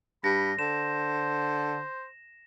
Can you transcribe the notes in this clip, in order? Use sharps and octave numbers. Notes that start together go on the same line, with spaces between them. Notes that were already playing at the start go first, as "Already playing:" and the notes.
G2 B5 A#6
D3 C5 E7